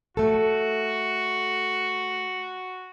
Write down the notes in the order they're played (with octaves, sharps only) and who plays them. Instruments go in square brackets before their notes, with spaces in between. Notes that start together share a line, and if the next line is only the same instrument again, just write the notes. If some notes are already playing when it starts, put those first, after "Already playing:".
[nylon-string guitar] A3 A4 [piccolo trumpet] F#4